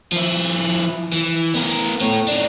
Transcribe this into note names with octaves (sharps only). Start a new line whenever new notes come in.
F3 E4
E3
B3 A#4
A3 C#5
D4 D#4